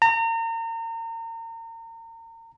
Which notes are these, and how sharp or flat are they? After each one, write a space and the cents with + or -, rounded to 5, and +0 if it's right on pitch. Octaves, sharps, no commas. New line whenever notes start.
A#5 -35